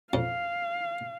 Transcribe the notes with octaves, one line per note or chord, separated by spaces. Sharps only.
F2 F5